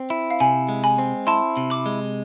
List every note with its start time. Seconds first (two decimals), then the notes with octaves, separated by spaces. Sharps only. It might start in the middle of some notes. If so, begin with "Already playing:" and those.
Already playing: C4
0.10 E4
0.30 F5
0.40 C3 G#5
0.69 G#3
0.84 G#5 B5
0.98 C4
1.27 E4 A5 C6
1.57 C3
1.70 B5 D6
1.86 G#3